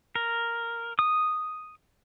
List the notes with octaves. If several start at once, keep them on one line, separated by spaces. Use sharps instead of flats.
A#4
D#6